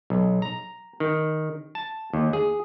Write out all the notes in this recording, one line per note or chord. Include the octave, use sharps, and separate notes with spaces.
B1
A#5
D#3
A5
D#2
G#4